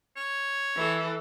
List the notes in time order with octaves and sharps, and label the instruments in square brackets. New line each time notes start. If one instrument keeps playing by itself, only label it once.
[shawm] C#5
[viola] E3 A4